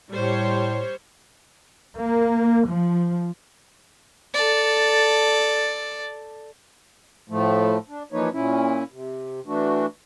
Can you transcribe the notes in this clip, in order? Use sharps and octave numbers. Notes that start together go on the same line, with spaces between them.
A2 G3 C5 C#5
A#3
F3
A4 D5
A2 F3 A3
D4
E3 F3 A#3 D#4 B4 C#5
A#2 C#4 E4
C3
E3 A3 D4 F#4